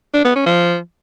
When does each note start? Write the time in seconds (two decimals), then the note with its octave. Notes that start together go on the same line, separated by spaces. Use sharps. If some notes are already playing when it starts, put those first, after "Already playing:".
0.14 D4
0.25 B3
0.36 C#4
0.46 F3